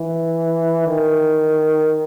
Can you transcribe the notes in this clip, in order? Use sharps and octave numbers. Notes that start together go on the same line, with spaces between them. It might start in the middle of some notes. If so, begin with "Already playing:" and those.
Already playing: E3
D#3